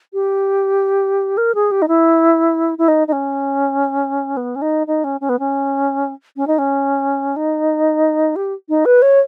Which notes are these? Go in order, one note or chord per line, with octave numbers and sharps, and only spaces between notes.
G4
A#4
G#4
G4
D#4
E4
E4
D#4
D#4
C#4
B3
C#4
D#4
D#4
C#4
C#4
B3
C#4
C#4
D#4
C#4
D#4
G4
D#4
B4
C#5